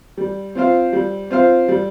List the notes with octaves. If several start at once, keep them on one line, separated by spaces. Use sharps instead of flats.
G3
C4 F4 C5 F5
G3
C4 F4 C5 F5
G3